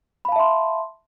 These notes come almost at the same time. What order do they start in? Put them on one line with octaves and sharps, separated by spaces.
B5 F5 A5 E5 C6